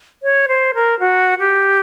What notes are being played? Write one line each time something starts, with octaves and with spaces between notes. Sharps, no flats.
C#5
C5
A#4
F#4
G4